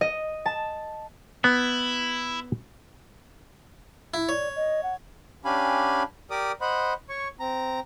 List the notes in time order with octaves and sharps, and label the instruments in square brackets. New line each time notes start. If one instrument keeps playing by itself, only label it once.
[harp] D#5
A5
[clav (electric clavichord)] B3 [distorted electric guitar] E4
[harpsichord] E4
[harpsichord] C#5 [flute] D5
[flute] D#5
F#5
[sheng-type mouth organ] C#4 D4 G4 F5 G#5 B5
G4 A#4 D5 D6 D#6
C5 D#5 F#5 B5
C#5 C#6
C4 A#5